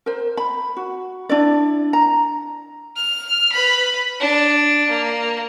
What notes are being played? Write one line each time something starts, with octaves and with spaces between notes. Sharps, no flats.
A#4 C5
B5
F#4
D4 E4 D5
A#5
F6
B4 B5
D4
A#3